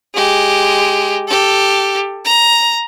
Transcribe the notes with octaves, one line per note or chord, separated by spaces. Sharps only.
G#3 G4
G4 A4
A#5